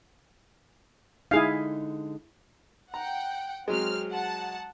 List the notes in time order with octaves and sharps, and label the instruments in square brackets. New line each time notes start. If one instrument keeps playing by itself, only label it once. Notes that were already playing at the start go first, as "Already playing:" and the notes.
[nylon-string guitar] D3 G#3 D#4 [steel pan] E4 G#4 F5
[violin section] F#5 G5 [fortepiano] A#5
[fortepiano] F#3 G#3 [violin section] C4 F6
[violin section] F#5 A5